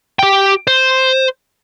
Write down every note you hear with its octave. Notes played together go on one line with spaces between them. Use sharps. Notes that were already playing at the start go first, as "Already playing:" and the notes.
G4 G5
C5